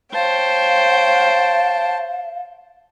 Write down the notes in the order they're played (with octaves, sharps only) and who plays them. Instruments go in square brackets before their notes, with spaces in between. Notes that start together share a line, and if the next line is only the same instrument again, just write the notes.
[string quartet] C5 C#5 G5 [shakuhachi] F5 [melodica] A5